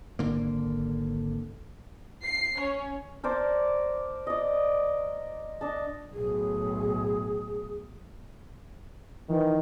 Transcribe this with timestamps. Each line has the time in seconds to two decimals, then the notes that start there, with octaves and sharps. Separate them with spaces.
0.19 G#1 D3 A#3
2.25 C7
2.58 C#4 C#5
3.24 A#4 C5 D5 A5
4.27 D5 D#5
5.61 D4 D#5 A5
6.13 B1 A2 G#4
9.29 D#3 E3